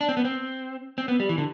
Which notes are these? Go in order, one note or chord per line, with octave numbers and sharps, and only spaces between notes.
D4
C4
B3
C4
C4
B3
G3
E3
D3